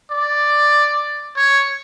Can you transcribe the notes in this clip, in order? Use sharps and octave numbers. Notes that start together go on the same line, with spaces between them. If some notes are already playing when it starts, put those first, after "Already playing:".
D5
C#5